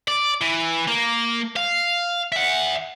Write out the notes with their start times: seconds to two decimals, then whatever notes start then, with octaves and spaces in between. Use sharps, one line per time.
0.08 D5
0.41 E3
0.88 A#3
1.56 F5
2.32 E5 F#5